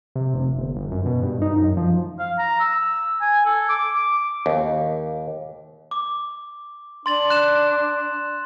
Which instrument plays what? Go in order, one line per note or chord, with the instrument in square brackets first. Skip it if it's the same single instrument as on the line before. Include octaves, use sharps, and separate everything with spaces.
[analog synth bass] C3
F1
G1
G1
F#2
B2
G2
D#4
F#2
F3
[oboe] F5
A#5
E6
G#5
A4
D6
D6
[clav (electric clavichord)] D#2
[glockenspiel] D6
[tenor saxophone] D4 [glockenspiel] C6 A6 F#7
[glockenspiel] F#6 A6 E7